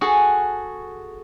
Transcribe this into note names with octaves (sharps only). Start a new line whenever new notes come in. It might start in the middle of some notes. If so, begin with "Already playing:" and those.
F#4 G#4 A4